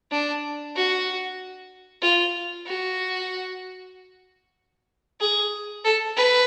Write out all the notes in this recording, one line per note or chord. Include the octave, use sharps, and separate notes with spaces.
D4
F#4
F4
F#4
G#4
A4
B4